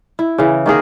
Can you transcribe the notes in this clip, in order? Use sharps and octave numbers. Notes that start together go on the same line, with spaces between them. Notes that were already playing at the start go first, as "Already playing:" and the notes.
E4
C#3 E3
D#3 A#3 G#4 A#4